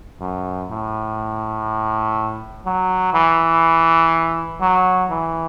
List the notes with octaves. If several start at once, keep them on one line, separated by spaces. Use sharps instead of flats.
F#2
A2
F#3
E3
F#3
E3